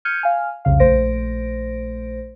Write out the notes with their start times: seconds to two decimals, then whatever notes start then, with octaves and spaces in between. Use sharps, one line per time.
0.05 F6 G6 G#6 C#7 D#7
0.21 F5 G#5 F6
0.65 C2 F2 C#3 F5
0.79 A#1 A3 C5 A#6 D7